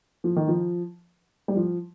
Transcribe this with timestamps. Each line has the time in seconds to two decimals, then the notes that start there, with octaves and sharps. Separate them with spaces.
0.24 F3
0.36 D#3
0.48 F3
1.48 G3
1.56 F3